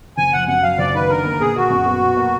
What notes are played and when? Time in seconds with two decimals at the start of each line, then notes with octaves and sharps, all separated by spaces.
0.17 F#1 G#5
0.33 F3 F#5
0.47 F#2 F#5
0.63 F#3 F5
0.78 F#1 D5
0.95 D#3 B4
1.09 D3 A#4
1.25 A#3
1.40 A#2 G#4
1.56 A#3 F#4
1.70 F#2
1.86 B3
2.01 B2
2.17 A#3